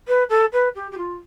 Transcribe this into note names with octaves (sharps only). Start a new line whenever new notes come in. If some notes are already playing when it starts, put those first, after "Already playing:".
B4
A4
B4
G4
G4
F4